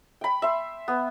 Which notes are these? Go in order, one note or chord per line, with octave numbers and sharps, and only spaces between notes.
G5 B5
E5 C6
B3